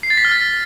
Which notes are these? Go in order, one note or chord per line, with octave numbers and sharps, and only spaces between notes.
C7
A6
B6
F6
A6